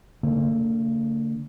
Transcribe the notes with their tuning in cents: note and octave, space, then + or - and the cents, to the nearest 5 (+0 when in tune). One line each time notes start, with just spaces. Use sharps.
D3 -20 A#3 -40